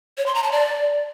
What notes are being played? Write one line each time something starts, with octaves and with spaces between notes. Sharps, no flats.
C#5
C6
A#5
A5
D5